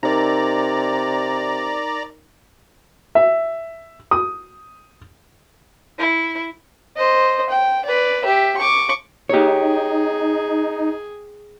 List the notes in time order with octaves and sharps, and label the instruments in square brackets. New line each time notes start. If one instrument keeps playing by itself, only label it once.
[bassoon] C3 [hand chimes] D#4 A#4 [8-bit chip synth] D5 A#5
[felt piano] E5
D#6
[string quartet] E4
[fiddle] C5 D#5
G5
B4 D5
G4 E5
C#6 D6
[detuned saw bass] D#4 [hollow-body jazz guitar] G4 C#5 [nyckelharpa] G#4